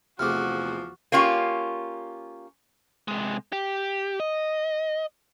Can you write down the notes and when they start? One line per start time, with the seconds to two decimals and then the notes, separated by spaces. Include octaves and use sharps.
0.19 E2 C3 F3 A3 F#4 G#4 D6 F6
1.12 A#3 C#4 F4 G4
3.08 C3 G#3
3.53 G4
4.20 D#5